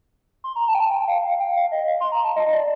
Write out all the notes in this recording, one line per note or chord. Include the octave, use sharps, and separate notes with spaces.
C6
A#5
A5
G5
A5
G5
F5
F5
G5
F5
D#5
F5
C6
A#5
A5
D#5
D5